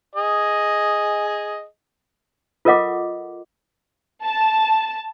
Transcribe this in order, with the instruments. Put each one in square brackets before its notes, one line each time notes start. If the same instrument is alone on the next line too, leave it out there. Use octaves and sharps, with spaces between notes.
[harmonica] G#4 D#5
[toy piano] F4 A4 A#4 D#5 F#5 D6
[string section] A5